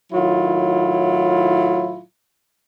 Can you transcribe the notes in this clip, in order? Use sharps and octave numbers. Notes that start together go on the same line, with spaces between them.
A2 D#3 F#3 E4 F4